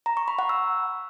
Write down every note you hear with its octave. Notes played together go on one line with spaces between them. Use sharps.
A#5
C#6
B5
F#5
E6